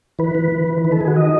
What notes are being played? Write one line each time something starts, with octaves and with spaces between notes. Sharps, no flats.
E3 B4
E3
E3
E3
D#3 B4
A4
D#3 G#4
F#4
D#5